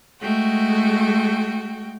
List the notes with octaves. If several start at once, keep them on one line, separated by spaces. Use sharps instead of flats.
G#3 A3 F#4 G5